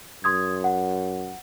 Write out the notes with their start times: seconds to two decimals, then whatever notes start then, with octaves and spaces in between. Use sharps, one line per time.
0.24 F#2 C6 D#6 G#6
0.64 F#5